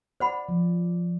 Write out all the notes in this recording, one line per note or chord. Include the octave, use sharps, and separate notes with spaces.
C5 D5 F#5 B5
F3